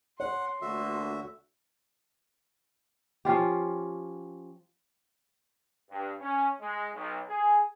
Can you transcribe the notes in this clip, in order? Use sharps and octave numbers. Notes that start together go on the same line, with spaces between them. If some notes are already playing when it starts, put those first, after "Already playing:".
C#5 F#5 C6
D2 A#2 D3 F#4 E5
F3 C#4 F4 G4
G2
C#4
G#3
B1
G#4